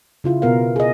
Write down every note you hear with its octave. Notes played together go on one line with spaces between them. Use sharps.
C#3 E4 F4
B2 B3 A#4 F5
G#4 D#5